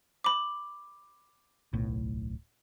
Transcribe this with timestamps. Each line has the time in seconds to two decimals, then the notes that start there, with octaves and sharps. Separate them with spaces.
0.24 B5 D6
1.73 D1 B1 A2